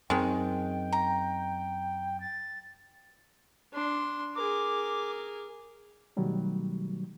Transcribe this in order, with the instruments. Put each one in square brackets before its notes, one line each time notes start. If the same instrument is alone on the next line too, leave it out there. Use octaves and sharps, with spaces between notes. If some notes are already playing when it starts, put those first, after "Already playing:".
[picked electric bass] F#2 C4 [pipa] D#3 G#3 [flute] G5
[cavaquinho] A#5
[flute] A6
[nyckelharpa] D4 C6
[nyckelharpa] G#4 A#4 [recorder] D6
[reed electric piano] B2 D#3 F#3 G3 A3